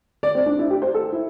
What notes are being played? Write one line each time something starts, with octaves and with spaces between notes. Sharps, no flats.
D5
C4
D4
E4
G4
C5
A4
E4